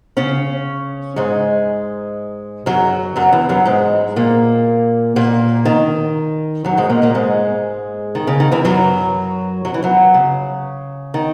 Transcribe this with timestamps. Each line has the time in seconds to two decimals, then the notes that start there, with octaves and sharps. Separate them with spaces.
0.17 C#3 C#4
1.16 G#2 G#3
2.66 F#2 F#3
3.16 F#2 F#3
3.32 E2 E3
3.49 F#2 F#3
3.65 G#2 G#3
4.16 A#2 A#3
5.16 A#2 A#3
5.65 D#3
6.64 F#2 F#3
6.77 G#2 G#3
6.89 A#2 A#3
7.02 A#2 A#3
7.15 G#2 G#3
8.15 D#3
8.27 C#3
8.40 D#3
8.52 E2 E3
8.64 F#2 F#3
9.65 F#3
9.74 E3
9.83 F#2 F#3
10.14 C#3
11.14 D#3